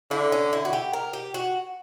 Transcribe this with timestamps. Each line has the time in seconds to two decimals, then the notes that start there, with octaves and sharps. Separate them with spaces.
0.11 D3 E4
0.32 C#4
0.53 E4
0.65 F#4
0.73 G4
0.93 A#4
1.13 G4
1.34 F#4